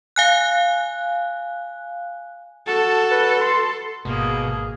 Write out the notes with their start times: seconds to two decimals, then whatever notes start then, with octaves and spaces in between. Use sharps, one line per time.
0.16 F5 G#5 F#6
2.67 F#4 A4 A5
3.11 B4
3.41 C6
4.05 G#1 G#2 B2 A#3 G#4